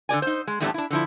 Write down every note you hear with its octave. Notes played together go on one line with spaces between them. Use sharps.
D3 G#4 D5 G#5
D#4 C5
G#3
E2 A2 G3 A3 C4 D4
D4 E4
D3 F3 E4